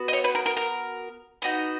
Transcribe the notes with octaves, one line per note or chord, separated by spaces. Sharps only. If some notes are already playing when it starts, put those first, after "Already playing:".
Already playing: B3 F#4
D#5
C#5
B4
A#4
A#4
A#4
B3 D#4 F#4